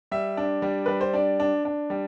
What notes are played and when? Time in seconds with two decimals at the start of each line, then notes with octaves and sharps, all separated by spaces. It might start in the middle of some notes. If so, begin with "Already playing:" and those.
0.11 G3 E5
0.37 D4
0.62 G3
0.86 G3 B4
1.01 C5
1.13 D4 D5
1.40 D4
1.65 D4
1.90 G3